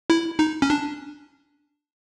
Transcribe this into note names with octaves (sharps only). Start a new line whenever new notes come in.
E4
D#4
C#4
D4